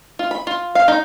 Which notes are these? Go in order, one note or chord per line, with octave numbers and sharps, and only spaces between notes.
F4
B5
F4
F5
D#4